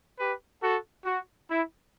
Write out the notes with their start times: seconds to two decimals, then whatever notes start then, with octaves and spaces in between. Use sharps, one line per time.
0.19 G4 B4
0.62 F#4 A4
1.05 F#4
1.48 E4